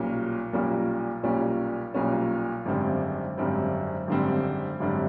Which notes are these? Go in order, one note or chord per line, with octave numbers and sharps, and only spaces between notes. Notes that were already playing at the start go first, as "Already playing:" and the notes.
Already playing: B1 A#2 G3 A#3 C#4
B1 A#2 G3 A#3 C#4
B1 A#2 G3 A#3 C#4
B1 A#2 G3 A#3 C#4
G#1 F#2 D3 G3 C4
G#1 F#2 D3 G3 C4
G#1 F#2 D3 G3 C4
G#1 F#2 D3 G3 C4